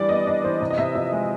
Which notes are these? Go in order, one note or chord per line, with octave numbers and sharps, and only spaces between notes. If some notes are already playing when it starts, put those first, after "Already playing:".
Already playing: E3 G3 D4 D5
B3 D#5
D4 D#5
E3 C5
C3 D#5
D#5
C3 E5
F3 D#5
G#3 E5